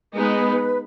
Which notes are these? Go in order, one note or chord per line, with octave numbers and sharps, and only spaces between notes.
G#3 B3 D#4 B4